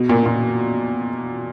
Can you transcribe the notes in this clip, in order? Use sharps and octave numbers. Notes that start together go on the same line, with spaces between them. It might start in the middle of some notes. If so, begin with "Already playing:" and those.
Already playing: B2
A#2
A#2